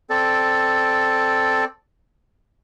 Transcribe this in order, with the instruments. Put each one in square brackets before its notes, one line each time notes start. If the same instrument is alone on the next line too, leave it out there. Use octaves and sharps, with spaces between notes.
[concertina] C4 A4 D5